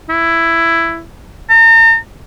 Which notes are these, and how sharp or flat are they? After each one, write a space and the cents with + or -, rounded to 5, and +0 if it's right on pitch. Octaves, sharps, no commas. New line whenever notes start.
E4 +10
A#5 -40